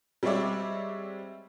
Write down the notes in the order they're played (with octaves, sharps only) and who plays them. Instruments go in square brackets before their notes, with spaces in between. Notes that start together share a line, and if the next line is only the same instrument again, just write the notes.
[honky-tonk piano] G3 G#3 C4 C#5 D5 E5